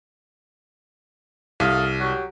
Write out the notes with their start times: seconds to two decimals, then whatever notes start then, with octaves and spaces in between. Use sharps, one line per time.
1.60 C2 A4 D#5 F5
2.00 F#3 F#4 G4